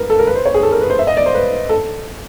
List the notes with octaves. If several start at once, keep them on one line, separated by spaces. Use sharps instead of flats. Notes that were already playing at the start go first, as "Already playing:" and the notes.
Already playing: A#4 B4
A4
A#4
B4
C5
C#5
G#4
A4
A#4
B4
C5
E5
D#5
D5
C5
B4
A4